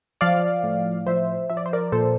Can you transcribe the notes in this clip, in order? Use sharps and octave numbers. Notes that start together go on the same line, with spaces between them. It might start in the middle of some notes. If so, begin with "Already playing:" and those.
F3 D5 F5
A2
F3 C5 E5
F3 E5
D5
C5
A#4 D5
A#2 A4 C5